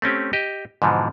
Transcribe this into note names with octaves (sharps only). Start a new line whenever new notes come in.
A3 C4 C#4 G4
G4 D#5
G#2 B2 D3 E3 F3